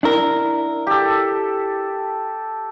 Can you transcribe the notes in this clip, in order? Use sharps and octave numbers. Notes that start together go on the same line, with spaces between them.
D4 E4 A#4
G4 A4